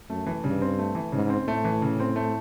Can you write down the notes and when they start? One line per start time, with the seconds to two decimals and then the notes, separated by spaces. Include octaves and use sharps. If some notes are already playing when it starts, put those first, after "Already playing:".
0.09 F#2 A3
0.26 E3
0.44 G2 C#3
0.62 C4
0.79 A3
0.95 E3
1.12 G#2 C#3
1.30 C4
1.47 A2 A3
1.65 E3
1.82 C#3
2.00 C4
2.16 A3